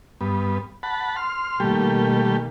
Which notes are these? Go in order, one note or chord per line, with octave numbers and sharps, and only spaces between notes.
G2 B3
F#5 A5 B5
C6 F6
B2 D#3 G3 A3 A#3 G4